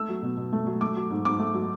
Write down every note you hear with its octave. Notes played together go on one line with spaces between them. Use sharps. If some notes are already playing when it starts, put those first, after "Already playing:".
Already playing: A3 E6
F#3
B2
B2
A3
F#3
A3 D6
F#3
G#2
G#2 D6
A3
F#3